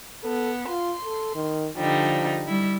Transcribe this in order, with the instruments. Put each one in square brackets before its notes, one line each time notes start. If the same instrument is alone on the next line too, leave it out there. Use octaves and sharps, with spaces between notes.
[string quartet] B3 [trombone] A4
[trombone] F4 [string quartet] C6
[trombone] A4
D#3
[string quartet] D3 G3 D#4 [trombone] F3
[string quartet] G3 E4